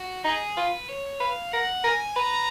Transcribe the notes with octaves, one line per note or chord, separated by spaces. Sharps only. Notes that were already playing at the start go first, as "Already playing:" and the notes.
Already playing: F#4
D#4 G#4
F4 B4
C#5
B4 F5
A#4 F#5
A#4 G#5
B4 A#5